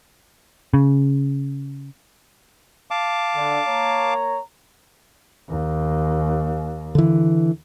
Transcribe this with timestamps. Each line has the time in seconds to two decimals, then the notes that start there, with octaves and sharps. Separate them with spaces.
0.74 C#3
2.91 F5 A5 D6
3.35 D3
3.67 A#3 C#5 A#5
5.49 D#2
6.95 D3 E3